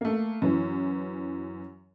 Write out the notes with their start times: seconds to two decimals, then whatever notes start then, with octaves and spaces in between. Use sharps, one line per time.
0.01 A3 A#3
0.42 F#2 E3